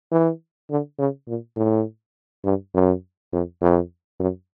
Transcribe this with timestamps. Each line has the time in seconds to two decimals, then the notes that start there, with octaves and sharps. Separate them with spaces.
0.12 E3
0.70 D3
0.99 C#3
1.28 A#2
1.57 A2
2.45 G2
2.74 F#2
3.33 F2
3.61 F2
4.20 F#2